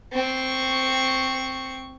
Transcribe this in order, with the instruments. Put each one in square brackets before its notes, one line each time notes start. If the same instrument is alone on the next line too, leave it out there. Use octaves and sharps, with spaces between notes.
[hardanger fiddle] C4 C#6